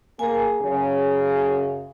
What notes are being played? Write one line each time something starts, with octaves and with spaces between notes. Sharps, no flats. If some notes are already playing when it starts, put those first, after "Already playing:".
A#3 G#4 G#5
F#2 C#3